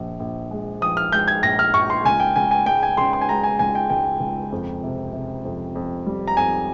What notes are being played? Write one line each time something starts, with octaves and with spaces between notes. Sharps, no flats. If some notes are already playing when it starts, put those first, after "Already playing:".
Already playing: A#1 F3
A#1
G#3
F3 D#6
F6
G#3 G6
G#6
A#1 A#6
F6
A#1 C#6
C6
C#2 G#5
G5
C#2 G#5
G#5
G#3 G5
G#5
C#3 C6
C6
G#5
G#3 A#5
G#5
C#2 G#5
G5
C#2 G5
C#2
F2
C3
C3
F2
F2
G3
A#5
F2 G#5